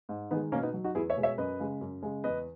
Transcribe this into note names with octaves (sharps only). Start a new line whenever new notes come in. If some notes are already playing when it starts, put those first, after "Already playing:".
G#2
D#3 G#3 B3 D#4
B2 A#3 C#4
B3 D#4
F#3
D#4 F#4
E2 E4 G#4
C#5 E5
B2 G#3
C#5 E5
F#2 B4 D#5
C#3 G#3
F#2
C#3 G#3
E2 B4 D#5